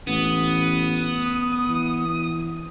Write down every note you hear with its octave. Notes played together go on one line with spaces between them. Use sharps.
A1 B3 D#6
E3